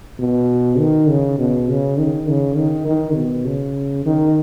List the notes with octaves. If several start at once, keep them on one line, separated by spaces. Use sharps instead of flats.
B2
D#3
C#3
B2
C#3
D#3
C#3
D#3
D#3
B2
C#3
D#3